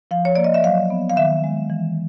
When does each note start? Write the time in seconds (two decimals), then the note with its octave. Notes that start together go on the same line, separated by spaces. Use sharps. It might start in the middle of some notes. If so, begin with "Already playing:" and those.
0.11 F3 F5
0.25 C#5
0.36 A#3 D5
0.44 D#5
0.54 E5
0.64 F#3 F5
0.90 B3
1.10 F5
1.16 D#3 E5
1.44 G#3
1.70 E3